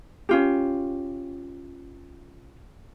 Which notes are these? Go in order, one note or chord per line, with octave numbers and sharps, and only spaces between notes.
C#4 F4 G4